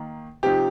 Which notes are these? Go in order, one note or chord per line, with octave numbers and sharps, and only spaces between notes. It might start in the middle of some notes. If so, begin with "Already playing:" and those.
Already playing: D#3 A#3
C3 F3 D#4 G4